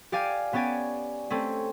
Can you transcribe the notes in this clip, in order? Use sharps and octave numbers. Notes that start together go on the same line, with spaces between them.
G4 D5 F5 G#5
B3 C#4 G4 D5 G#5
A3 C4 C#4